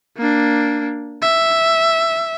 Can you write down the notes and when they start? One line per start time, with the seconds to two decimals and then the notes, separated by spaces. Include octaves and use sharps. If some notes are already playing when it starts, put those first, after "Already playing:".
0.17 A#3 D4
1.22 E5